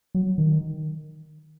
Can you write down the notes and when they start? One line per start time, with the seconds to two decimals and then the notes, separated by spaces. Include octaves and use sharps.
0.15 F#3
0.38 D#3